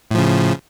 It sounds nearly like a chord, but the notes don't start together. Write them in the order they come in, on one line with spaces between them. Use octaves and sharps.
A2 F3 C#3